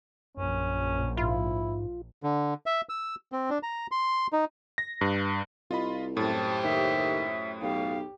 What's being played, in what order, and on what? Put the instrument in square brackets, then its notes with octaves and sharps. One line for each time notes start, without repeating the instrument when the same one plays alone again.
[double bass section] A#1 [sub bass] F#2 [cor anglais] C#4
[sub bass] G#2 [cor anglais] E4 [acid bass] F4
[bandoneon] D3
E5
E6
C4
D4
A#5
C6
D#4
[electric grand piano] A#6
G2
[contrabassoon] C2 [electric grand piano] F4 D#5 B5
[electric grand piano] F#2 A2 [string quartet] G4 C5 [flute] A5
[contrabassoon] D#2 [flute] E5
[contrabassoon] B1 [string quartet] G4 [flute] F5